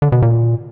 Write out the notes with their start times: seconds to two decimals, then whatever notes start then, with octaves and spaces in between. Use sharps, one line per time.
0.02 D3
0.12 B2
0.22 A#2